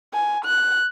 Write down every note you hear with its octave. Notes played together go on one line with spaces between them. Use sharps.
G#5
F#6